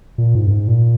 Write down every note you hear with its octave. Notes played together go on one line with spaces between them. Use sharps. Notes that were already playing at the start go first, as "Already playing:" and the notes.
A#2
G#2
F#2
G#2
A#2